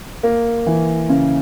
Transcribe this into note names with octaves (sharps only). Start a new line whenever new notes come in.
A#3
E3
C#3